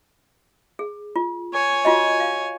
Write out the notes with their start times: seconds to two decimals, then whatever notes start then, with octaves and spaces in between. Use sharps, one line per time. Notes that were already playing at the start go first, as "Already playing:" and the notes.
0.79 G#4
1.16 F4
1.53 C#5 G#5
1.85 F4 F#4 D#5
2.20 F5